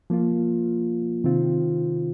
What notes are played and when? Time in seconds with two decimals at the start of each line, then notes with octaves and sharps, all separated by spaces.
0.10 F3 A#3 F4
1.24 C3 D#3 C4 F4